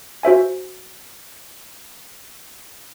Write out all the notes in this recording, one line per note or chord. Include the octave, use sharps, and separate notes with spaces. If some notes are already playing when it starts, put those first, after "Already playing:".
F#4 C5 E5 G#5